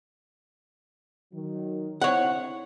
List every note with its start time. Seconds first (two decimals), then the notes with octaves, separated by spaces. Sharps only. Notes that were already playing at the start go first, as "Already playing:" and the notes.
1.33 D#3 F#3
2.02 D3 C4 E4 C#5 F#5